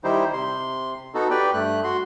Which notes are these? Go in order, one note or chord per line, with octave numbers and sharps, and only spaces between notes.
D#3 G3 D#4 E4 G4 C5
C3 C6
B3 D#4 F#4 A4
G4 B4 D5 G5
G2 A3 F#6
F#4 C6